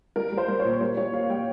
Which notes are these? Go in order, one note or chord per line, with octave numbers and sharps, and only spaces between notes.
G3 A#4
G3
C5
G3
C#5
A#2
G3 C#5
G3 C#5
G3 F5
G3 G5